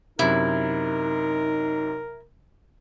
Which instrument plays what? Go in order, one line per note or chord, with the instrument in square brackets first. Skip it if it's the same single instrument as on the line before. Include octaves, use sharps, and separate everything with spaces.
[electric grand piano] F#2 C3 [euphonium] D#4 [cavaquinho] E4 [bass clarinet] A#4